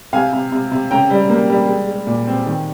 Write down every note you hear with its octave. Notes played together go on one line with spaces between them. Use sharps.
C3 F5 G#5
C3
C3
C3
C#3 G5 A#5
G3
A#3
G3
G#3
G#3
A#2
C4
D#3